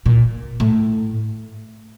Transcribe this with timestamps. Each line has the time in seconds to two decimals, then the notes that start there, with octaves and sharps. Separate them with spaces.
0.06 A#2
0.60 A2